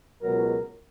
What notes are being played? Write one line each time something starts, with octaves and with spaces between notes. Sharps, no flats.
C#2 B2 F#3 A#4